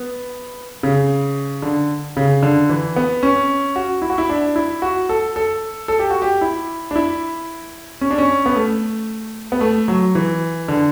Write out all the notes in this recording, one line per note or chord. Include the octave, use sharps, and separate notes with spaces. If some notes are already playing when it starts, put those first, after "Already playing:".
Already playing: B3
C#3
D3
C#3
D3
E3
B3
C#4
F#4
E4
F#4
E4
D4
E4
F#4
A4
A4
A4
G4
F#4
G4
E4
D4
E4
C#4
D4
C#4
B3
A3
B3
A3
F#3
E3
D3